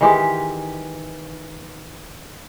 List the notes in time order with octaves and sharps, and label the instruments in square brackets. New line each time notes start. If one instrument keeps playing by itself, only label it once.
[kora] D#3 E3 G#3 G4